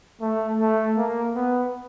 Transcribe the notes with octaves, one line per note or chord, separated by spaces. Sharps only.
A3
A3
A#3
B3